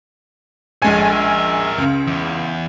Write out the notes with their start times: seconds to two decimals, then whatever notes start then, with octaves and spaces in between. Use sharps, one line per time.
0.82 A#1 G#3 A4 C#5 G#5
1.12 A#4 E5
1.78 C#2 C#3
2.07 E2